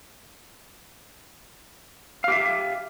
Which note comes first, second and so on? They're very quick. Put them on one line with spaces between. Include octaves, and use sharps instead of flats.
F5 G4 E5